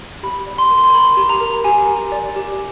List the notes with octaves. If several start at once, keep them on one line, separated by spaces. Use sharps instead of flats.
G4 B5
D5
C6
A#4
C6
A#4 B5
G4
A#5
A#4
G4 G#5
G4
D5
G4